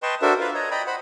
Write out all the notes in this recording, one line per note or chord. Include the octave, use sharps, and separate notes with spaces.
B4 D#5 G5 A5 C6 C#6
D4 F#4 A4 A#4 C5 E5
F4 B4 F5
C#5 D#5 A#5
D5 D#5 G5 A#5 B5
C5 F#5 B5